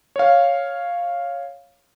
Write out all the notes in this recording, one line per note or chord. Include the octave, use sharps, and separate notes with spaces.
C#5 F5